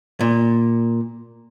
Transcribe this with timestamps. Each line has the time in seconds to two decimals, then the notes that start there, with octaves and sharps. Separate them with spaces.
0.21 A#2